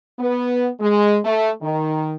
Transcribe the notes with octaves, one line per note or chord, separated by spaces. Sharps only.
B3
G#3
A3
D#3